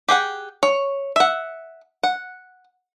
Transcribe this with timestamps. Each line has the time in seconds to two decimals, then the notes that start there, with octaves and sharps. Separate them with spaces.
0.08 G4 G#4 F#5 G5
0.63 C#5
1.16 E5 F#5
2.03 F#5